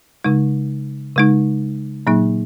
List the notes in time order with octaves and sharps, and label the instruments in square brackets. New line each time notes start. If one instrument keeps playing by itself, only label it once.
[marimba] C#3 G#3 D#4
C#3 G#3 D#4
A#2 F#3 A#3 D#4